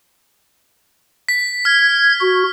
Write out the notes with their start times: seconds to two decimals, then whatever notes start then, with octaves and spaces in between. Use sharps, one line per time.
1.29 B6
1.65 F6 G#6
2.21 F#4